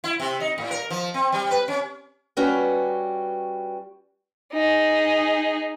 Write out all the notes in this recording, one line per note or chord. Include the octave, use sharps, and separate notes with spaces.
E4
C3
D#4
A2
A#4
F3
C4
G3
B4
C#4
G3 C#4 F#4 B4 G5
D#4 G#4